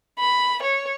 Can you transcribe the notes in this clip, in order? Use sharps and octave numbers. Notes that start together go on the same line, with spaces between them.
B5
C#5